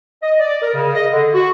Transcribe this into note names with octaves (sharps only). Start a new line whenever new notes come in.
D#5
D5
A#4
C#3
D#5
D3
F#4